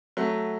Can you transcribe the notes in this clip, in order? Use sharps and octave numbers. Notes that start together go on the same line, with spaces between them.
F#3 A3